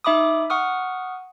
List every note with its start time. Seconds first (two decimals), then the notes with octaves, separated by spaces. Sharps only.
0.04 D#4 E5 B5 D6 D#6
0.50 F#5 C#6 D#6 F6